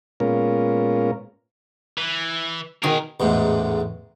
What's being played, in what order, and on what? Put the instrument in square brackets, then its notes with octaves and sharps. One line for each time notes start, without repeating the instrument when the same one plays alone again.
[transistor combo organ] A#2 G#3 B3 C#4 F4 A#4
[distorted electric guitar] E3
[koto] B2 D#3 [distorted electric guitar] G#4 A#4
[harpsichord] A1 E2 G#2